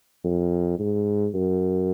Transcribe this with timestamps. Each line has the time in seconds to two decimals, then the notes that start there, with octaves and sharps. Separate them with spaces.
0.24 F2
0.79 G#2
1.34 F#2